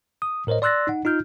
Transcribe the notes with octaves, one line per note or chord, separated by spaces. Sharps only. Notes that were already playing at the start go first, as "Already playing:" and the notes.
D#6
A2 A#4 C5 C#5 D#5
D5 C6 E6 F#6 A6 A#6
D#4 F#5
D#4 F4 F6 G6